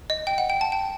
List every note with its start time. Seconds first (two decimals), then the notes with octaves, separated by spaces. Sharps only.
0.10 D#5
0.27 G5
0.38 F#5
0.50 G5
0.61 A5
0.72 G5